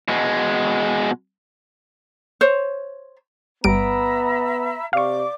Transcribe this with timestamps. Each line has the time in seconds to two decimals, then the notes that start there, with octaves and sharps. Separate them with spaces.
0.08 B2 G#3
2.41 C5 C#5
3.64 G1 G3 B3 E5 A#5 B5 D7
4.93 C3 D5 F5 C#6 D6